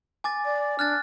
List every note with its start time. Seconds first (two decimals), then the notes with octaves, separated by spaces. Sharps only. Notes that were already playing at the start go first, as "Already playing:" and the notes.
0.24 G#5 D6 A6
0.45 D5
0.79 D4 F6 F#6 A6